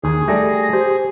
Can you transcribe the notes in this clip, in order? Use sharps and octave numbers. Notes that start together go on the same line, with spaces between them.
D#2 G#4
G3 A3 G4 A#6
G4 C5